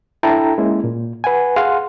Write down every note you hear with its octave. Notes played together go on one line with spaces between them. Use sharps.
D4 E4 A4 G5 A5 A#5
G#3 A#3 C#4 E4
A#2
B4 F#5 G#5
G#4 F5 F#5 C6